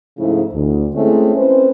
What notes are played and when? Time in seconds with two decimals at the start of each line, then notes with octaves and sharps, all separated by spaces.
0.19 G#2 C#3 F3 A3 E4
0.54 D2
0.95 G#3 A3 C4 C#4 E4
1.36 C4 C#4 B4 C5